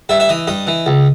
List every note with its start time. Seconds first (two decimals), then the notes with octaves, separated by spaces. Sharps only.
0.09 G2 E5
0.20 E5
0.29 E3 D#5
0.47 G2 D#5
0.67 E3
0.86 C#2